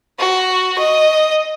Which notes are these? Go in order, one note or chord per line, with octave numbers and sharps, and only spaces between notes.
F#4
D#5